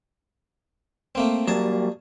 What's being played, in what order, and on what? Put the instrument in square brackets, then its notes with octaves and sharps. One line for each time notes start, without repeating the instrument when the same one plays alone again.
[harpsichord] A3 A#3 C4
[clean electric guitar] F#3 G3 A#3 [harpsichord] G#4 A5